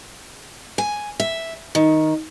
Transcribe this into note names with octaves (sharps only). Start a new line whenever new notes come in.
G#5
E5
D#3